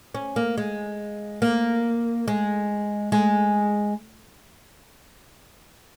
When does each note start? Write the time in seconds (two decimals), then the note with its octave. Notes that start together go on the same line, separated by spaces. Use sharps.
0.15 C#4
0.36 A#3
0.58 G#3
1.42 A#3
2.28 G#3
3.12 G#3